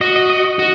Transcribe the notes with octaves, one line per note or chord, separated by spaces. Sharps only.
F#4 D#5
D#5
D#5
D#5
F#4